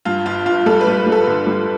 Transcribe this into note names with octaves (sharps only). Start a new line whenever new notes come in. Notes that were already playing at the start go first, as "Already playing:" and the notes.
G2 F4
G1 F4
G1 F4
G3 A4
B4
G3
G3
A4
D3
G3